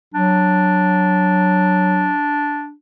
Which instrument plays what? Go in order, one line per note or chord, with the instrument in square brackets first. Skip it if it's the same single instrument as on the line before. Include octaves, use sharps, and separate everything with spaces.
[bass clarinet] F#3 [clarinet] D4